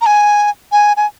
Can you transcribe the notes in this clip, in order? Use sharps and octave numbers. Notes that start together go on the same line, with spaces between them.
A#5
G#5
G#5
G#5